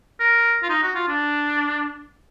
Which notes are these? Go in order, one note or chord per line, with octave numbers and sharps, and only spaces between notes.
A#4
F4
D#4
F#4
F4
D4